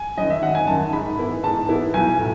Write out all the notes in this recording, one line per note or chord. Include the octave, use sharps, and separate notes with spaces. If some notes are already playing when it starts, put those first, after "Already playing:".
Already playing: G#5
F#2 D#3 D#5
E5
G#1 F#5
G#5
F#2 D#3 A5
G#2 B5
E3 B3 E4
G#2 A5
E3 B3 E4
B1 G#5
A2